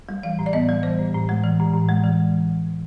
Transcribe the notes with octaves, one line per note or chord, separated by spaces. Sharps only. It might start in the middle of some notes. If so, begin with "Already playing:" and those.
G3
E3 F5
A2
D5
B3 D#5
G3
E3 C5
A2
A2
G#3
E3
A2
A2
G#3
E3